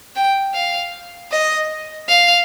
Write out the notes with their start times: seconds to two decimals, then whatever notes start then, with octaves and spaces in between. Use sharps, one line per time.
0.16 G5
0.54 F5
1.31 D#5
2.09 F5